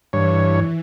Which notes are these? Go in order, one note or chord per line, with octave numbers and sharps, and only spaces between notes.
G2 E3 C#5